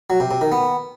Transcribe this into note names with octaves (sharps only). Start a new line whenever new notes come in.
F#3
C3
C3
D#3
B3